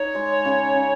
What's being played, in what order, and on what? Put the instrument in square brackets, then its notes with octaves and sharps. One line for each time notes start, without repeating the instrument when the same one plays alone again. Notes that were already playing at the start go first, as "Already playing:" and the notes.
Already playing: [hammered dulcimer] D#4 [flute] C#5
[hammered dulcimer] G#3
C#3
C#3